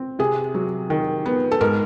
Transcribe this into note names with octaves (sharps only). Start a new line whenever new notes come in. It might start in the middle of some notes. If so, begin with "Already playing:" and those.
Already playing: C4
C3 G#4
F#3
D#3
B3
A4
G#2 A#4